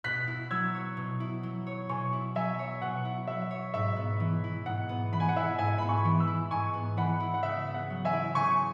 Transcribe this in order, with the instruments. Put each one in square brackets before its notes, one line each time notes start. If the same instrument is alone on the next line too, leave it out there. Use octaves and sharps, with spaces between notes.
[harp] B2 [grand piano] F#6 B6
[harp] E4
[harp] F#3 [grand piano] E6 G#6
[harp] C#5
B2
E4
F#3
C#5
[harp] B2 [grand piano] G#5 C#6
[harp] E4
[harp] F#3 [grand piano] E5 G#5
[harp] C#5
[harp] B2 [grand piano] F#5
[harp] E4
[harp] F#3 [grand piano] E5
[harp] C#5
[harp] G#2 [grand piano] E5
[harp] B3
E3
E4
[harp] G#2 [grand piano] F#5
[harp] B3
[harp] E3 [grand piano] B5
[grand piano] G#5
F#5
[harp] E4 [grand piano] E5 G#5
[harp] G#2 [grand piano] E5 G#5
[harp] B3 [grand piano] B5
[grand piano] G#5 C#6
[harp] E3
[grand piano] B5 E6
[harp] E4
[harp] G#2 [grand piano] G#5 C#6
[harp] B3
[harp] E3 [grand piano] F#5 B5
[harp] E4
[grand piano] F#5
[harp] C#3 [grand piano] E5
[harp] B3
[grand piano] F#5
[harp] F#3
[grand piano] E5 G#5
[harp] E4
[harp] C#3 [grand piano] G#5 C#6